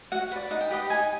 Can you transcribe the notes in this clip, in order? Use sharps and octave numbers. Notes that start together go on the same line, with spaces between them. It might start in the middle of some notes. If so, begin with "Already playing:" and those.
F#4 F#5
B4 D5 F#5
D#4 F#5
G5
G4 B4 D#5 F#5
D#4 G#5